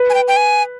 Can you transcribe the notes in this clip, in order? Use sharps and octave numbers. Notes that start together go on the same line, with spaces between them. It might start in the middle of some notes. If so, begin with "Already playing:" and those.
Already playing: B4
G#5
G5
G5
G#5